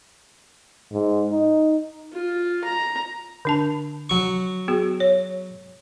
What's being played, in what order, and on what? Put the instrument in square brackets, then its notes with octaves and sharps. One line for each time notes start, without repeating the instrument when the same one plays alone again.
[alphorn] G#2
D#4
[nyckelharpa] F4
A#5
[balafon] D3 D4 A5
[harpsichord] F#3 C#6
[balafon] B3 F#4 G#4
C#5